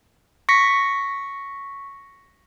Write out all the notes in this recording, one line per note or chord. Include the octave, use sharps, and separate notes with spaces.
C#6 A#6 B6 C#7